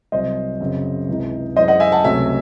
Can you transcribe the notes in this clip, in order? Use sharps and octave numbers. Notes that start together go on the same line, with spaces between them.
C2 C3 F#3 C5 D#5
F#2 C#3 F#3 C4
C#2 C3 E3 G#3 D#4
F#2 E3 G#3 D#4 C5 D#5
D#5 F#5
E5 G#5
F#5 A5
C#2 C3 F#3 A3 E5 G#5